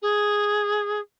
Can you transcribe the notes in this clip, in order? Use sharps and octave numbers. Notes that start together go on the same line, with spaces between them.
G#4